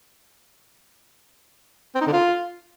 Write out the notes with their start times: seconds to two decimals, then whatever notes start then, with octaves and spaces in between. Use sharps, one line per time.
1.95 C4
2.01 D#4
2.07 D3
2.13 F4